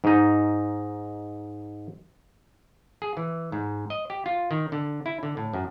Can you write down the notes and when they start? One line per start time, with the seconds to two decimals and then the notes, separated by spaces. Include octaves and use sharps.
0.04 G#2 D#4
3.02 G#4
3.17 E3
3.52 G#2
3.90 D#5
4.10 G4
4.26 F4
4.51 D#3
4.72 D3
5.06 E4
5.23 D3
5.37 A2
5.54 F#2